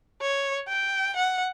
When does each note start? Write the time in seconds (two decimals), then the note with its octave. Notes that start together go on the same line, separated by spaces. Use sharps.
0.21 C#5
0.68 G5
1.16 F#5